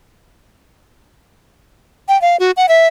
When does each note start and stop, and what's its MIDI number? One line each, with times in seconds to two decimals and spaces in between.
2.09 2.20 79
2.22 2.37 77
2.40 2.51 66
2.57 2.69 78
2.69 2.87 76